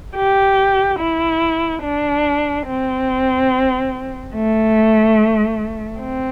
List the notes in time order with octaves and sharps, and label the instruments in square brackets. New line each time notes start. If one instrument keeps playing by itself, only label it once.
[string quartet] G4
E4
D4
C4
A3
C4